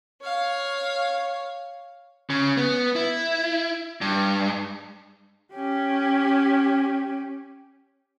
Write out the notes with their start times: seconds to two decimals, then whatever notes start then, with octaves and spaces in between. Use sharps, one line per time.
0.22 C#5 F5
2.30 C#3
2.57 B3
2.96 E4
4.01 G2
5.54 C#4 G4